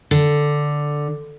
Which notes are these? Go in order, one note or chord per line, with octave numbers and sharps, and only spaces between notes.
D3